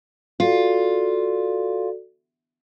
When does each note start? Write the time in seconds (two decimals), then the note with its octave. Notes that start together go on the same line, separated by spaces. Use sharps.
0.40 F4 F#4 A4 D5